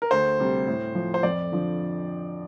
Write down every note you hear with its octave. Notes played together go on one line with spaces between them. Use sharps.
A#4
D2 C5
C3 G3
A2
F3
C5
F2 D5
D3 F3